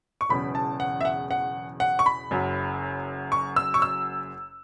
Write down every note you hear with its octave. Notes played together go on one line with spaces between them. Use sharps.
C#6
E1 E2 C#3 F#3 B5
A5
F#5
E5
F#5
F#5
F#5
C#6
B5
F#1 F#2 F#3
C#6
E6
C#6
E6